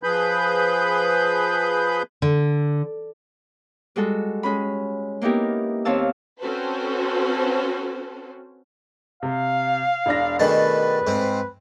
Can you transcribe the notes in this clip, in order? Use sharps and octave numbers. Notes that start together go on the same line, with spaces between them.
F3 G#4 B4 B5 G6
D3
G3 G#3 F#4 A4
G#3 C#4 B5
A#3 B3 D#4 E4 G4 A#4
D#2 C4 C#5 F5 A5 E6
C4 C#4 F#4 A4 B4 C5
C3 F5
E1 D4 A#6
B2 D#3 A3 D4 G#4 B4 A5
G#2 C4